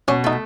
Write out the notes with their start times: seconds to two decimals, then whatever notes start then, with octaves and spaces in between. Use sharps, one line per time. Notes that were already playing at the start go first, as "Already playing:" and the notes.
0.08 B2 C#4
0.24 A3 D#4